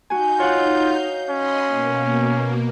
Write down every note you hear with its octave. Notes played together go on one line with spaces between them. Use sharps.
D#4 F#4 G#5 G6
F4 C#5 F#5
F5
C#4 D#5 B5 C6
B2 A#3